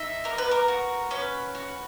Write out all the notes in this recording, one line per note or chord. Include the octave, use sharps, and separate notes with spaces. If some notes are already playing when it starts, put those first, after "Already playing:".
Already playing: D#4 E5
B3 A#4
B4
A#4
F#4
C#4 B4
F#4